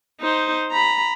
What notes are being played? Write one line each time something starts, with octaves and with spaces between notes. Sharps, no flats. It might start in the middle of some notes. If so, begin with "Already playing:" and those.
D#4 C5
A#5 B5